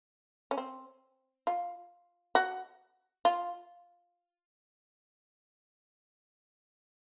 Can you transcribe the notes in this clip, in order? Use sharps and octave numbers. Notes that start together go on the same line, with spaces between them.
C#4
C4
F4
F#4
F4